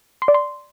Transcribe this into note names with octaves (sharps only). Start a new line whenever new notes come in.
C6
D5
C6